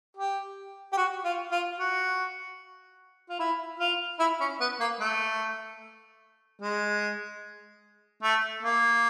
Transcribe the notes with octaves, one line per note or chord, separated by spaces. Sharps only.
G4
G4
F#4
F4
F4
F#4
F4
E4
F4
E4
C#4
B3
A#3
A3
G#3
A3
A#3